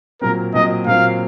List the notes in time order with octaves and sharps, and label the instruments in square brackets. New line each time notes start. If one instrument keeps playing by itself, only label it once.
[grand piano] A#2 F#3 C4 [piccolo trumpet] A#4
[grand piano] A#2 F#3 C4 [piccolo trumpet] D#5
[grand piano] A#2 F#3 C4 [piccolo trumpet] F5